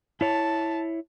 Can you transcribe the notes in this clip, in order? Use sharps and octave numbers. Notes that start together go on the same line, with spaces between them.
E4 C#5 A5